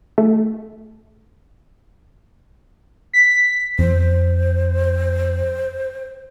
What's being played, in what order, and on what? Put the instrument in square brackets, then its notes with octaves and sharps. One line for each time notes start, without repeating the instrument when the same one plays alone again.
[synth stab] A3
[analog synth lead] B6
[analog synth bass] F2 [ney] C5